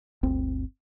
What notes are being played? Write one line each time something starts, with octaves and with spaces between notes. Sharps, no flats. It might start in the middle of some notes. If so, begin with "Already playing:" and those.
G1 D2 C4